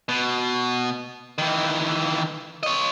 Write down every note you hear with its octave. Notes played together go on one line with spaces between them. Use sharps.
B2
D#3 E3
C#5 D#5